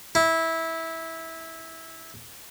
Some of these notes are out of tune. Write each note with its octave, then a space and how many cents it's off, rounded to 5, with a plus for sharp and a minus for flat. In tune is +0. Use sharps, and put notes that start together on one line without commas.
E4 -15